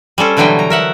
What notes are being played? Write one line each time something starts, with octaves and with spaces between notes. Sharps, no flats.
G3 C#4 A4 C5
B2 D3 E3 F#3 G3 G5
A#5
A#4 E5 F#5